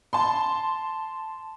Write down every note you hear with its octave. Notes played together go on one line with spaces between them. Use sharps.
A5 C6